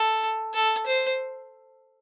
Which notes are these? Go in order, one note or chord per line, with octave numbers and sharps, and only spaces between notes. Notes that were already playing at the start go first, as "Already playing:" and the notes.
Already playing: A4
A4
C5